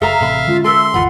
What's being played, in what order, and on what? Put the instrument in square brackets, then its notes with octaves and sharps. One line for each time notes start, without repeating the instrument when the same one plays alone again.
[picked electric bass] F#1 [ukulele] A4 A#5 [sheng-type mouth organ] E5 F5
[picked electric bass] A1 C3 [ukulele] A4 B5
[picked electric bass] D3 G#3 C#4 [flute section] F4
[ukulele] A4 A#4 E5 [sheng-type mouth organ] C6 [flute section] E6
[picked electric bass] G#1 E2 [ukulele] F4 B5 [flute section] F#5